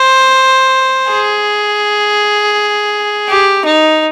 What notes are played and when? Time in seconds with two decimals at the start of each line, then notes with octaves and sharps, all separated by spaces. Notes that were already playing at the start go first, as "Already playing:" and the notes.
Already playing: C5
1.10 G#4
3.29 G4
3.65 D#4